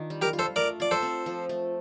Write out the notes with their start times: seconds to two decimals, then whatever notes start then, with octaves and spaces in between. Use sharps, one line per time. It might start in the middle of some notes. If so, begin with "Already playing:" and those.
Already playing: D#3 D4 F4
0.10 G3
0.22 G4 A#4
0.33 F4
0.39 A4 C5
0.56 A3 A#4 D5
0.80 F4 D5
0.91 A4 C5
1.02 C4
1.26 F3
1.49 A3